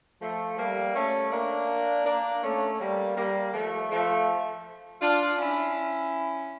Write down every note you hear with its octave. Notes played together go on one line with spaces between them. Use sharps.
F3 A3
G3 A#3
A3 C#4
A#3 D4
A#3 D4
A3 C#4
G3 A#3
G3 A#3
F3 A3
F3 A3
D4 F4
C#4 E4